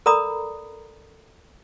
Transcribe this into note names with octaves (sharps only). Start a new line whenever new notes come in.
A4 A#4 D5 A#5 B5 D#6